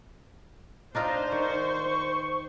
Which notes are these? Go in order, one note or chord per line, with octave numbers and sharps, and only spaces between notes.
D4 D#4 F4 C5 D5 F5 A#5
D#3 C#6